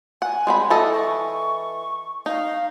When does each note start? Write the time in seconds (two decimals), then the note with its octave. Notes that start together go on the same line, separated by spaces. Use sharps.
0.22 F#5 G#5
0.47 G#3 C4 B5
0.70 E3 A4 D#5
0.93 C#6
2.26 D#4 F5